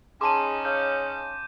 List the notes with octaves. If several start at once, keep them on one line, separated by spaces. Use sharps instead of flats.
C#4 D#4 G#4 A5 C6 D6 D#7
C#3 G6